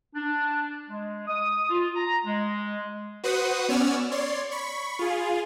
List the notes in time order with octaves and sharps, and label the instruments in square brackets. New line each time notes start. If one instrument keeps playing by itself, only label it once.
[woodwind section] D4
G#3
D#6
F4
A#5
G#3
[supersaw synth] F#4 B4 C5 F#5 D#6
B3 C#4 C#5 D5 E6 F6
C#5 D5 C6
B5 C#6
F4 G#4